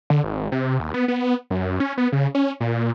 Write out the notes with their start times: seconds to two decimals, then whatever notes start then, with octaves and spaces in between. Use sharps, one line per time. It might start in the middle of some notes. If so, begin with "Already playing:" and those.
0.10 D3
0.24 G#1
0.52 C3
0.80 D#2
0.94 B3
1.08 B3
1.50 F#2
1.80 C#4
1.98 B3
2.12 C#3
2.35 C#4
2.60 A#2